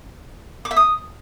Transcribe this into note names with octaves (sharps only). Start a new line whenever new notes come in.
D6
E5
D#6